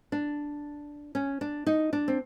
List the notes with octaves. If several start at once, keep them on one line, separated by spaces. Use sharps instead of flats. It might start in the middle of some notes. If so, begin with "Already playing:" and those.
D4
C#4
D4
D#4
D4
C4